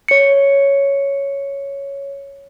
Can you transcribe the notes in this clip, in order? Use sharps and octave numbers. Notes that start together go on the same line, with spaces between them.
C#5 C#7